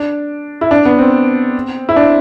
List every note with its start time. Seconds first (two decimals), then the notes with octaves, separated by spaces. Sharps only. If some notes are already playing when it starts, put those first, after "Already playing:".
Already playing: D4
0.61 E4
0.71 D4
0.85 B3
0.99 C4
1.89 E4
1.96 D4